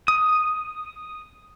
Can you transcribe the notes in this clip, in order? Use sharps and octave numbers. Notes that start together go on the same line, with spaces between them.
D#6